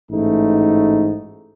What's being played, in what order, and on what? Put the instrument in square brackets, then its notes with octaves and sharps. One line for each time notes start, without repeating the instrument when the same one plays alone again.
[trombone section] A1 G#2 A3 D#4